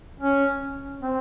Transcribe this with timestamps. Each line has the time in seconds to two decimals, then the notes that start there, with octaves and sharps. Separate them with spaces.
0.21 C#4
1.01 C4